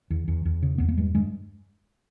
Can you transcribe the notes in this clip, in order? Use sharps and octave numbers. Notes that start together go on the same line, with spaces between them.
E2
E2
E2
C#3
E2 B3
A#3
G2 G#3
G2 G#3